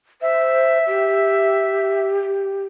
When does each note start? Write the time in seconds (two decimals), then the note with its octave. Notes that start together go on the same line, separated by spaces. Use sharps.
0.22 C5 E5
0.87 G4